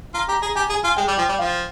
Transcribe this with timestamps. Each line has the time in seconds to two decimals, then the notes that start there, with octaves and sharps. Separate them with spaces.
0.14 F4 A#5
0.28 G4 A#5
0.42 G#4 A#5
0.56 G4 G#5
0.69 G#4 G#5
0.84 F4 G#5
0.97 G#3 G5
1.08 G3
1.17 F3 G5
1.29 G3
1.39 F3 F5